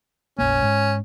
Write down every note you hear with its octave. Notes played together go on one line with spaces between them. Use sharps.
F1 A#1 A#3 C#4
G#2